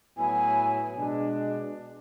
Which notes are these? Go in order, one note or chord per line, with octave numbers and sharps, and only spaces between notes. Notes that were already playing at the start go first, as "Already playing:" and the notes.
A2 F#3 B3 E4 G#5
B2 G#3 D4